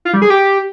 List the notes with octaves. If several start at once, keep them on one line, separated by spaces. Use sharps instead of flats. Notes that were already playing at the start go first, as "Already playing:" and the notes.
F4
G3
G#4
G4